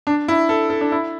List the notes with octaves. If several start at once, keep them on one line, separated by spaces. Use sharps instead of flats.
D4
E4
A4
A4
D4
E4